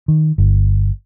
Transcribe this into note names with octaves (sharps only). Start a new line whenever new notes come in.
D#3
G1